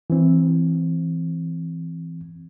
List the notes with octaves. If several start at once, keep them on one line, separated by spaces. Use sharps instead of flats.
E3 C4